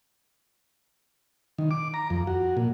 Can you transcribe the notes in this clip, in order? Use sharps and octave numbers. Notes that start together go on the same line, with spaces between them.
D#3
D6
A#5
F2
F#4
A#2